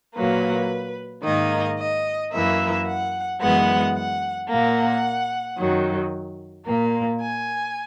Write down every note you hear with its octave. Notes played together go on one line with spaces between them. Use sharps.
A#2 F#3 A#3 B4
G#2 D#3 A#3 D#5
D#5
F#2 E3 A#3 E5
F#5
F#2 E3 G#3 B3 F#5
F#5
A#2 A#3 F#5
F#2 D#3 F#3
A#2 A#3
G#5